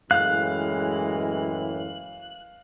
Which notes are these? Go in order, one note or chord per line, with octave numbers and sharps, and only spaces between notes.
F#2 A2 E3 G#3 F5 F#6